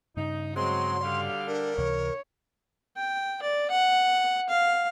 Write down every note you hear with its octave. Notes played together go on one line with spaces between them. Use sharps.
G2 C#3 D#4
F#3 G#3 C4 C6
D3 G3 F5
D4 A#4
C#2 C3 E3 C#5
G5
D5
F#5
F5